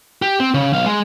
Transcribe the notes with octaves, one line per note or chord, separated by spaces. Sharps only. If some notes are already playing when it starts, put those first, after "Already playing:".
G4
C4
C#3
B1 F5
G#3